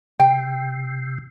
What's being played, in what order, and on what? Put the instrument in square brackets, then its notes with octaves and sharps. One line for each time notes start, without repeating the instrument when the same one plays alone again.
[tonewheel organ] C3 [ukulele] G5